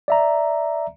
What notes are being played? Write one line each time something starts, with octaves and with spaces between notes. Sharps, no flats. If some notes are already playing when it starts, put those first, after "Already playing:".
D5 E5 A#5